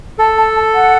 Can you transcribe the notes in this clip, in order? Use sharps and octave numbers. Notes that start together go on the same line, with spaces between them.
A4 A5
A5
A5
F#5